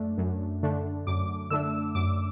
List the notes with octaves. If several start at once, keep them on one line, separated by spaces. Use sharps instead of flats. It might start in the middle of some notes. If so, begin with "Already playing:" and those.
Already playing: F#2 A3 D4
F#2
D3 A3 D4
F#2 D6
D3 A3 D4 E6
F#2 D6